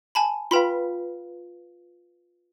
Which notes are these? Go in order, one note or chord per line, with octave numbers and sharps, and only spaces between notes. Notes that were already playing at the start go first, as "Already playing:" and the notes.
G#5 A5 B5
F4 B4 F5 G5 B5 C6